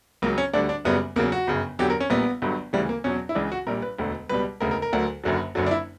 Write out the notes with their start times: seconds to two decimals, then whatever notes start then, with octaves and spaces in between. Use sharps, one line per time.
0.22 C#2 C#3 F#3 A#3
0.38 C#4
0.54 D2 D3 G3 D4
0.69 D4
0.85 F#1 F#2 C#3 G3 B3
1.16 E2 C#3 F#3 A#3
1.32 F#4
1.47 G1 F#2 C#3
1.79 E2 D3 F#3 G4
1.90 A#4
2.00 C#4
2.10 A#1 A#2 G3 B3
2.42 G1 G2 D3 F#3
2.73 D2 C#3 E3 G3
2.89 A#3
3.04 E2 B2 F#3 C#4
3.29 E4
3.35 C#2 C#3 E3 D4
3.52 F#4
3.67 A#1 A#2 G3 A#4
3.82 B4
3.98 E1 D2 D3
4.29 C#2 B2 G3 B4
4.60 E1 D2 C#3 A#4
4.71 A#4
4.82 A#4
4.93 D2 D3 F#3
5.24 F#1 F#2 D3 F#3
5.55 F#1 F#2 D3 F#3
5.66 D4
5.71 E4